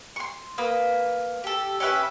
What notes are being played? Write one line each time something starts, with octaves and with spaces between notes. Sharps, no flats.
C6 C#6
A#3 B4 D#6
G4 A4
C#4 G4 B4 E5